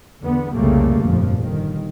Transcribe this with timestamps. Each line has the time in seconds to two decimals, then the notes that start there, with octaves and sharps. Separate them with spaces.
0.21 E2 D3 B3
0.55 C2 F2 C#3 G3 A3 A#3
1.02 G1 F2 A#2 F3
1.37 G1 D#3